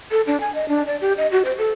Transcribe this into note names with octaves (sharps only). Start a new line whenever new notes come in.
A4
D4
G#5
D#5
D4
D5
G4
D#5
F#4
C5
A4